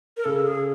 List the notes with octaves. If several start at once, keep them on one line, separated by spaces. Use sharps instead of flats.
A#4
C#3 A4
G#4